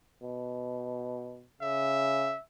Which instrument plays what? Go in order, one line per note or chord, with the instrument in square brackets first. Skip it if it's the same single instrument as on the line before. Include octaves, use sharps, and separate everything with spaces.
[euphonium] B2
[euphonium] C#3 [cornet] E5